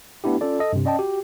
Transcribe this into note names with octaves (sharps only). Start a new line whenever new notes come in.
A3 B3 D4 E4 G4
C#4 F4 A4 D5
A4 D#5
G2 C3
C#4 D5 D#5 G5 A5
F#4 G4